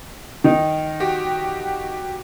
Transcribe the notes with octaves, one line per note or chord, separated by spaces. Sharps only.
D#3 D#4
F#4 G4